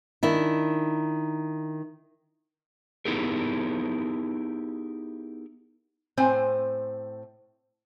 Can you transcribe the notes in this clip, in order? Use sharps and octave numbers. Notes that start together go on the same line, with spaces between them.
D#3 D4 E4
B3 D#4 E4 G4 G#4 A#4
A2 C4 C5 G#5